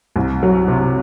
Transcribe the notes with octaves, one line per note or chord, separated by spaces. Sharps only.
C2
F#3
C3